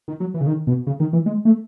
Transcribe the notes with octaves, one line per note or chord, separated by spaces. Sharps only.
D#3
F#3
E3
C#3
D#3
B2
C#3
D#3
E3
G#3
A3